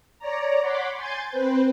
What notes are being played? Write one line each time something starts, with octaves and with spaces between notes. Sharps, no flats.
C#5 D5 A#5
C#5 F#5 B5 C6 D6
G#5 C6 G6 A6
C4 B4 C5